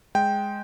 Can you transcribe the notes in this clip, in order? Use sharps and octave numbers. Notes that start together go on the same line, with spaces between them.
G#3 G5